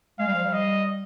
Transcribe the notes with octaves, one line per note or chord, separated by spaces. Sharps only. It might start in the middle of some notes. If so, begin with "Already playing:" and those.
G#3 F5
G3
F3
G3
D#5